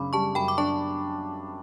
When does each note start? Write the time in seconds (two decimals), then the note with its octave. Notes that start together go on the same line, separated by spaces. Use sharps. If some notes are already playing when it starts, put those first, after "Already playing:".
Already playing: F#2 C#3 D4 B5 D6
0.13 G3 A5 C#6
0.35 F#2 G5 B5
0.48 D6
0.58 D4 A5 C#6